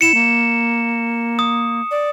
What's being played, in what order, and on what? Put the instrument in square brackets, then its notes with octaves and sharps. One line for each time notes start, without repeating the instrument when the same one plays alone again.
[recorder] E4 [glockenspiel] C#7 E7
[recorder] A#3
[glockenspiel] D#6
[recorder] D5